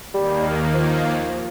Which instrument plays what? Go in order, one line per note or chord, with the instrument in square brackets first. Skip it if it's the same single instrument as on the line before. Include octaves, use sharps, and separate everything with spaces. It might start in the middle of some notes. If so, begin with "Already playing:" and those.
[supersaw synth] D#2 D#3 A#3 [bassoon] G3
[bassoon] F3